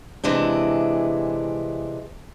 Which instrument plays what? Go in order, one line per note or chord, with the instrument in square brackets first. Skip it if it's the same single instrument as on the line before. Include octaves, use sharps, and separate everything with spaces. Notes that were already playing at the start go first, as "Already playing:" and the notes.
[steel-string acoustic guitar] C3 E3 G#3 D4